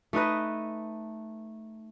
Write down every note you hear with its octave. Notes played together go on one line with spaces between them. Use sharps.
A3 D#4 B4 D#5